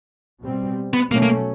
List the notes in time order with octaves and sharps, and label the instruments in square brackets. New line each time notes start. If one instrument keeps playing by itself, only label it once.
[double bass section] B2 G3 C4
[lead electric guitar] B3
[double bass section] B2 F#3 A3 C#4 [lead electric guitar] A#3
[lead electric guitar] A#3